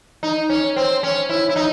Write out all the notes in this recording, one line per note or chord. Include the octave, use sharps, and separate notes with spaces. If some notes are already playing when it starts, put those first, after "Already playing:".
D#4
C#4
C4
C#4
E4
E4
D#4